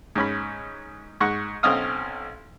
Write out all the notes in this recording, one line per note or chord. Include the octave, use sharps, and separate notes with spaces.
G#2 C#4 B5
G#2 F#5 C#6
B1 C4 C#4 D#5 F5 D#6